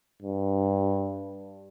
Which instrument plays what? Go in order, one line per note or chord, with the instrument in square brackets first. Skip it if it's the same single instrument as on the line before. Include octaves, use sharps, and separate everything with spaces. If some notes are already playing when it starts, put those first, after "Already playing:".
[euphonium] G2